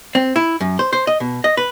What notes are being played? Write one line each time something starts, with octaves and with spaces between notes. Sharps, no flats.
C4
E4
F#2
C5
C5
D#5
B2
D#5
B4